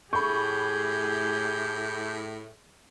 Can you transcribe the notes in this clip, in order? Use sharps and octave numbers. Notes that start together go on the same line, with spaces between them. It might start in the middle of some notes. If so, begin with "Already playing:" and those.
A2 G4 G#4 B5 C#6 G6